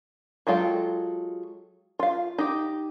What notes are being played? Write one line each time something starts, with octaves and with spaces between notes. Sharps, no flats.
F#3 G#3 F4 A4 G5
F4 F5
D#4 G4